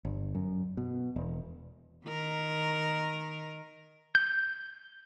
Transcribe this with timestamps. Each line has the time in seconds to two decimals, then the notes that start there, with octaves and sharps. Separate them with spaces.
0.05 G1
0.35 F#2
0.77 B2
1.16 E1
2.06 D#3 A#4
4.15 G6